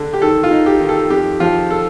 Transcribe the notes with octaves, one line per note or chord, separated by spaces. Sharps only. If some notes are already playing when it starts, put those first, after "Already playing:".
Already playing: D3
G4
D#3 A4
F4
D#4
G4
D#3
A4
F2 G4
F3 F4
A4